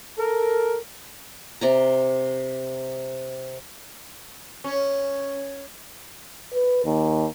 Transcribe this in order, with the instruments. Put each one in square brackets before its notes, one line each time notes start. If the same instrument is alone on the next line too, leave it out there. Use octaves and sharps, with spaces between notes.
[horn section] A4 A#4
[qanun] C3 D5 A#5
[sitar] C#4
[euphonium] B4
D#2